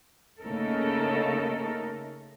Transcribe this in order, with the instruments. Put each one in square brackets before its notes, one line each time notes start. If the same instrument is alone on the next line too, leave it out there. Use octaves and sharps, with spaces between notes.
[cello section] C#3 A3 A#3 D#4 A4 A#4